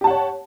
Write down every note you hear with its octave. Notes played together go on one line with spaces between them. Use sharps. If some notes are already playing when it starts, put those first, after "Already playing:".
G4 C#5 F#5 A5